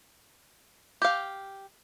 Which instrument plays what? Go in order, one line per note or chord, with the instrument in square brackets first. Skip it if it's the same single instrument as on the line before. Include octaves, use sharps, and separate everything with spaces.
[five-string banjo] G4 F5